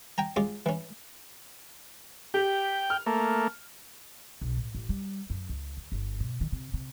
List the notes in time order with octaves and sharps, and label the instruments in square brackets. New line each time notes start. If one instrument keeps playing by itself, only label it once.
[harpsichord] G5 G#5 A#5
G#3 C#4 F4 D6
E3 C#4
[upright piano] G4 [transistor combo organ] G5
[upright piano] F6
[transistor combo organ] A3 A#3
[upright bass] B1
A2
A1
G3
F#2
C#2
D2
G1
B2
D#3
C3
C3